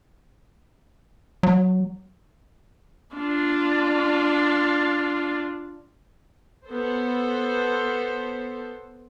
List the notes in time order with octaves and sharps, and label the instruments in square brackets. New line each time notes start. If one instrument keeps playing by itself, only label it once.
[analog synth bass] F#3
[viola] D4 F4
[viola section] B3 A4 C5